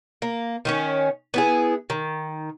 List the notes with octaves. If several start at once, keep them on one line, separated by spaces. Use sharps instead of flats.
A#3
D#3 C4 C#4
B3 E4 G#4
D#3